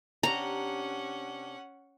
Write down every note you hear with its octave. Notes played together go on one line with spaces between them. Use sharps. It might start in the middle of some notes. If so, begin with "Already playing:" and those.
C3 C#4 D4 F#5 A#5